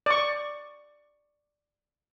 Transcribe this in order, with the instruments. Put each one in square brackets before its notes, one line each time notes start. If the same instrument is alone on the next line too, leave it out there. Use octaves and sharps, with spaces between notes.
[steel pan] D5 C#6